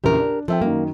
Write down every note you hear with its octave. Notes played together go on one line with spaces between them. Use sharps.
A#1 E2 C#3 G4 A#4
D4
F3 C4 A4 E5 G5
F#2 D#3 A#3